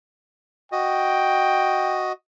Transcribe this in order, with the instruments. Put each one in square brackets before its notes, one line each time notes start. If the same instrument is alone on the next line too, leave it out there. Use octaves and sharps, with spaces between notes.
[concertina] F#4 D#5 [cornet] G5